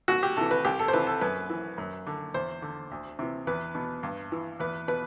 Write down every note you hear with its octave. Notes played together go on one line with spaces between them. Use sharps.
C2 F#4
G4
C3 E3 A4
B4
C2 G4
A4
C5
C3 E3 B4
A4
F#2 B4
E3
F#2
D3
E2 C5
D3
D2
C3 E3
E2 B4
B2
G2
E3
E2 B4
B2 B4